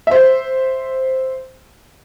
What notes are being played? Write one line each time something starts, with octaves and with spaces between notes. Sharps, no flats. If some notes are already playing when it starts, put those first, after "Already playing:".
C5 E5